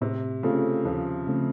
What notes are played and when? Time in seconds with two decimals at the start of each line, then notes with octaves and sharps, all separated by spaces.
0.01 A2 C3
0.43 C#3 A3 C4 F4 A4
0.85 D#2 F3
1.27 C#3 A3 C4